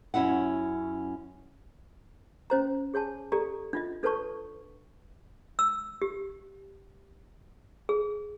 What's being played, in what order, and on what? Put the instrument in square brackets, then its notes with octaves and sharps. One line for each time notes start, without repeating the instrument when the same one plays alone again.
[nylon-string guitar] F#2 C#4 E4 F#5
[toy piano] C#4 C5 A#5
G#4 C#5 G#5 A5
G4 A4 D5 A#5
D4 F4 D#5
D4 A4 B4 C#5 A5 C#6
E6
G4
G#4